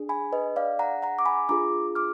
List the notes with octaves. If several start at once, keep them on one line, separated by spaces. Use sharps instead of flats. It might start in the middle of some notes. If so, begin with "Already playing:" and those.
Already playing: D4 G#4
G#5 B5
B4 D#5
D5 F5
F#5 A#5
F#5 A#5
D6
G#5 B5
D4 F4 G#4 A#5 D6
D6 F6